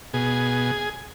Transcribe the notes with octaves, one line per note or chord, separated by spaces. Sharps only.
B2 G#4